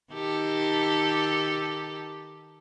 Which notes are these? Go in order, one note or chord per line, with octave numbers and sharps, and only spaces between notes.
D#3 G4 A4